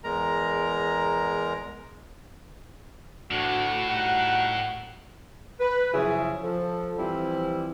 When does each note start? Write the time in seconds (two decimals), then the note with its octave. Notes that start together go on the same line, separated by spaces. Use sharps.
0.04 E2 G#3 A#4 A#5
3.31 D2 A2 D4 F#4
3.90 G3 D#4 F#4 F#5
5.60 B4
5.93 F#2 C#3 F3 E4 G#4
6.42 F3 A4
6.98 E3 F3 G3 C4 E4